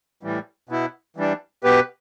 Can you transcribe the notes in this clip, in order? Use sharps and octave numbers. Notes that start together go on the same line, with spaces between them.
A2 E3 G3
B2 B3 E4
E3 G3 D4
B2 B3 G4 B4